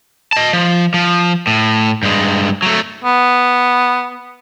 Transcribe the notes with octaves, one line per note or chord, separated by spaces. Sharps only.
D#5 A5
F3
F3
A2
G2 G#3
F#3 A3
B3